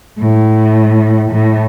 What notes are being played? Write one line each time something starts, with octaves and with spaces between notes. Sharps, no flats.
A2
A2